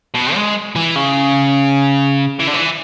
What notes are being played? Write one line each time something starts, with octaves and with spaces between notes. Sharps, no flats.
B2
G#3
E3
C#3
E3
D3
E3